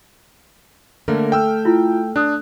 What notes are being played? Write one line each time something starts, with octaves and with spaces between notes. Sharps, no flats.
D3 A3 A#3 A#4
G5 E6 F6
E4 F4
D4 D#6 F#6